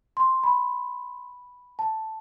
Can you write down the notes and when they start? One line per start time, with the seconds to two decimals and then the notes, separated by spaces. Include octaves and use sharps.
0.17 C6
0.44 B5
1.79 A5